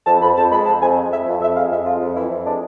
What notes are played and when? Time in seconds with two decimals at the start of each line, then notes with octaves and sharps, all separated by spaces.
0.06 F2 A5
0.22 F2 B5
0.37 F2 A5
0.52 G#3 B5
0.66 F2 A5
0.81 F2 G#5
0.97 G#3
1.11 F2 E5
1.26 F2
1.41 F2 E5
1.56 G#3 F5
1.71 F2 E5
1.86 G#3 F4
2.01 F2
2.16 E3 E4
2.31 F2
2.45 G#3 D4